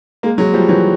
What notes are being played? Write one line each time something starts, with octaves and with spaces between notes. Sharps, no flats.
G#3 A#3
F#3 G#3
F3 G3
E3 F#3